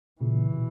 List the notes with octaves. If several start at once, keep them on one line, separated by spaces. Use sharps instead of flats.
A#2 C#3 E3
B2